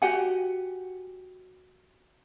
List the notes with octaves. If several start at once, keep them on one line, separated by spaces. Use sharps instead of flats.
F#4 G4 F#5 G#5